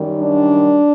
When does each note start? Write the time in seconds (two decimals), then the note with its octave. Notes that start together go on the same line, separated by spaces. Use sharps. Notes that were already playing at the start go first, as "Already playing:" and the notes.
Already playing: F#2 D#3 G3
0.17 D4